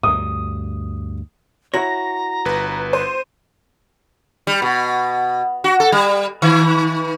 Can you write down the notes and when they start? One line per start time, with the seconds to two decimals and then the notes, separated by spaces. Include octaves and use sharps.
0.03 D2 G2 D#6
1.74 E4 F#4 C#5 A#5 A#6
2.45 G1 B4
2.93 C5 D#7
4.47 G3
4.62 B2
5.64 F#4
5.80 A4
5.92 G3
6.42 D#3